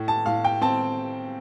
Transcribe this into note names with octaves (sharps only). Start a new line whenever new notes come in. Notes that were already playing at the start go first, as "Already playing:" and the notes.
Already playing: A2
A5
A2 F5
G5
C4 A5